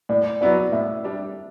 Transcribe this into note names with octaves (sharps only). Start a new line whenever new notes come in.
A2 D5
F#3 B3 E4 D5
A2 E5
G3 D4